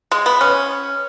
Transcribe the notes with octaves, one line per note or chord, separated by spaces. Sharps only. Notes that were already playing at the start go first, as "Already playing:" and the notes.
G#3
B3
C#4